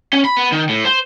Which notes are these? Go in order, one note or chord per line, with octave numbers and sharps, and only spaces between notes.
C#4
B5
B3
D#3
A2
C5